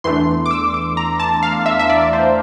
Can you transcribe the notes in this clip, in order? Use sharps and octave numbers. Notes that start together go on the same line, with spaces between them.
E2 E3 A3 D4 C6
D6
E6
D6
A#5
A5
F5
E5
E5
D5
C5